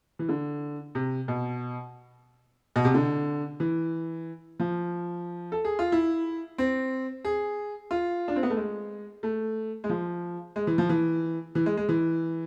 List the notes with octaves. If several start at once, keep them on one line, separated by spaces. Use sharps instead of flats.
E3
D3
C3
B2
B2
C3
D3
E3
F3
A4
G#4
F4
E4
C4
G#4
F4
D4
C4
B3
A3
G#3
A3
G#3
F3
G#3
E3
F3
E3
E3
G#3
G#3
E3